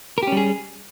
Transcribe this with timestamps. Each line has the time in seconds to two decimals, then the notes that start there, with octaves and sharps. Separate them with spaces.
0.18 A#4
0.23 G4
0.27 C#4
0.32 G3
0.37 G#4